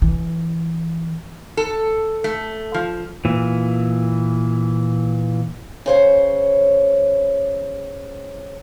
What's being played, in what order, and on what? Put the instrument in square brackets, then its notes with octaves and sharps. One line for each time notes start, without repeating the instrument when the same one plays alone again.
[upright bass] E3
[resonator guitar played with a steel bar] A4
A3
F3
[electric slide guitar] A#2 E3
[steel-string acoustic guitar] C#3 C5 C#5